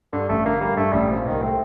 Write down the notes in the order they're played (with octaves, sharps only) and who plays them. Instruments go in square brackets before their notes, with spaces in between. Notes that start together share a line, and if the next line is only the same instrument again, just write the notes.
[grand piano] G2 [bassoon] D3
[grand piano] A1 [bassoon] A3
[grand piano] D3 [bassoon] A#3
[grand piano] G3 [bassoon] A#3
[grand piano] G2 [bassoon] A3
[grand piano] A1 [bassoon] G3
[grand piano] A#2 [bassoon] F3
[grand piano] C2 [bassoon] D#3
[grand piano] A3 [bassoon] C4